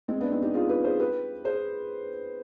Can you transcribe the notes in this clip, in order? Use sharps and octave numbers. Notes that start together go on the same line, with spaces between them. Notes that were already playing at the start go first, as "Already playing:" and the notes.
G#3 C4
B3 D4
C4 D#4
D#4 G4
F4 G#4
G4 B4
G#4 C5
G4 B4
G#4 C5